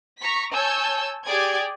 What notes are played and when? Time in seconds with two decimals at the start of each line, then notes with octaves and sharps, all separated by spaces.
0.20 A#5 C#6 B6
0.53 C#5 G#5 A5 E6 G6
1.28 G4 G#4 D5 D6 G#6